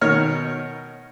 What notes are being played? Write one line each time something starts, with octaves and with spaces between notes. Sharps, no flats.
B2 D#3 A#4 C#5 F6